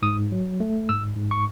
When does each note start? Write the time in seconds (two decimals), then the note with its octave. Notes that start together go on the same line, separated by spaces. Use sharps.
0.02 G#2 D#6
0.32 F#3
0.60 A3
0.89 G#2 E6
1.17 G#2
1.31 C#6